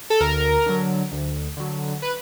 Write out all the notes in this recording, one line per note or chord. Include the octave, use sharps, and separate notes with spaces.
A4
D2 A#4
D3 F#3
D2
D3 F#3
B4